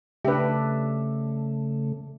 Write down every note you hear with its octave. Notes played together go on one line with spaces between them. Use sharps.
C#3 A3 D4 G4 B4 E5